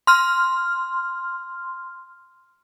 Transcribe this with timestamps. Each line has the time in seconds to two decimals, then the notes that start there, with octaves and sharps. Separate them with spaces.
0.07 C6 F6